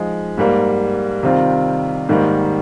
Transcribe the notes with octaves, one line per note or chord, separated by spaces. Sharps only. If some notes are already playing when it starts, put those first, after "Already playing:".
Already playing: F3 G#3 D#4
G#2 G3 A#3
C3 D#3 G3 C4 F4
G#2 D#3 G3 A#3